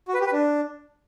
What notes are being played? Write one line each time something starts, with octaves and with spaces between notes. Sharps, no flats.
F#4
B4
G4
B4
D4